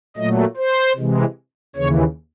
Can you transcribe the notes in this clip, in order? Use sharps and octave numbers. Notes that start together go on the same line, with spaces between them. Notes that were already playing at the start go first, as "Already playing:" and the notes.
A#2 F#3 A3 D#5
C5
C3 E3 G#3
D#2 C#3 E3 C#5